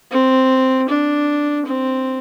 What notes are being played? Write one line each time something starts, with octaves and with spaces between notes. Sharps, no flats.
C4
D4
C4